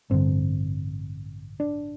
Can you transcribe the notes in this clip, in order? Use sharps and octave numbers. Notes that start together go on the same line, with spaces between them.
A1 G2 D3 C4
D4